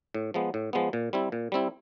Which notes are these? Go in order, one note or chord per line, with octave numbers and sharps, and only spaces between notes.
A2
F3 G#3 B3
A2
F3 G#3 B3
A#2
G3 C4 E4
A#2
G3 C4 E4